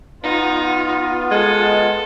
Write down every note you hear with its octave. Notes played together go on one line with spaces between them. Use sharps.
B3 D#4 F4
G#3 A4